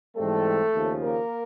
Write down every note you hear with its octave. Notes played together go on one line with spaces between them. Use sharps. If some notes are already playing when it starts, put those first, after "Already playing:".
G#2 E3 G3 A3 C4 A4
D#2 C#3 F3
A#3 A#4